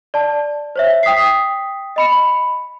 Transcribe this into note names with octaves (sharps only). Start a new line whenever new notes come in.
D5 A5
C5 C#5 E5
G5 D#6 B6 C7
D#5 B5 C#7
B5